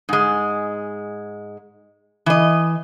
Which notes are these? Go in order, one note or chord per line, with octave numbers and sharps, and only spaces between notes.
G#2 G#3
E3 D#5